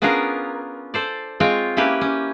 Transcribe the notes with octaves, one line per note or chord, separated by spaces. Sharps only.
B3 C#4 D4 F4 G#4 A#4
A4 C5 D5
G#3 C4 F4 C#5 G5
A#3 C#4 E4 G4 B4
C#4